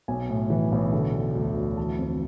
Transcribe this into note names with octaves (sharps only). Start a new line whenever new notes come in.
B1 G#5
A2
E3
B1
D3
D3
D2
D2
E3 A5
F2